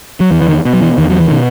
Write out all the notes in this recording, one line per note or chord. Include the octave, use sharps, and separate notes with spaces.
F#3
E2 E3
E3
D#3
B2
F#3
E3
E2 D#3
F#3
E3
D#3
B2